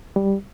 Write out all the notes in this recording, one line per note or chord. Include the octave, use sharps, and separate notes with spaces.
G3